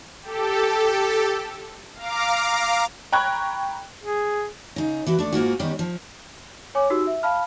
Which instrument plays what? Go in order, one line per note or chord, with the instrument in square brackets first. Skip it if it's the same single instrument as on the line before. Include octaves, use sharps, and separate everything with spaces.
[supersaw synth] G4 A4
F5 A#5 D6
[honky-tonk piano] G5 A#5 B5 C#6 F#6 G#6
[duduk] G#4
[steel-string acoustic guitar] C#3 D#4
E3 F#4 B4
A3 D4
G#2 A#3 F4 F#4
D#3 G3 B3 C#4 G4
F3
[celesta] C#5 G#5 D6
D#4 F#4 G4 E6
E5
F5 A5 B5 F6